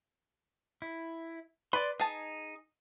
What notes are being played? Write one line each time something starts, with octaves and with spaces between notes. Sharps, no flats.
E4
B4 D5 C6
D#4 G#4 A5